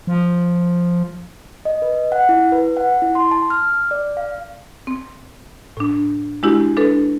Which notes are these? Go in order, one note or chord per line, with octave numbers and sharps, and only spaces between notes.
F3
D#5
B4
F#5
E4
B4
F#5
E4
C6
A5
F6
D5
F5
C4
A2 D4
G#3 D4 E4 F#4 G4
D4 A4 B4